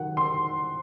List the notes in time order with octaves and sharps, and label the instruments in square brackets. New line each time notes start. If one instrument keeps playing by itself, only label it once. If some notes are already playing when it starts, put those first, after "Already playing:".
Already playing: [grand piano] D#3 F#3 F#5
C6